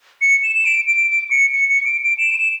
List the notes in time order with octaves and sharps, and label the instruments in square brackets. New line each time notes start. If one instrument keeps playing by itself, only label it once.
[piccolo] C#7
E7
E7
D7
D7
D7
C#7
C#7
C#7
D7
D7
E7
D7
E7